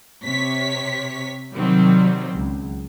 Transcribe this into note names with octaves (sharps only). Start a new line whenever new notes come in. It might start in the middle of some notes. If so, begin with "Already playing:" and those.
C3 C#5 B6
C3 D#3 F#3 G3 C4
C#2